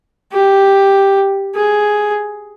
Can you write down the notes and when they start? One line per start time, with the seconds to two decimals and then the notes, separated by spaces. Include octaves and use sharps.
0.33 G4
1.55 G#4